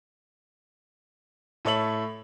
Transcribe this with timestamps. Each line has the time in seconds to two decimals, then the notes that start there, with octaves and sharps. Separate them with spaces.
1.65 A2 A4 C#5 E5 F#7